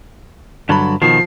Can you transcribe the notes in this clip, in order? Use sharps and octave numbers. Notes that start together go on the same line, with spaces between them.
G2 D3 F#3 A5 B5
B2 D#3 F3 C7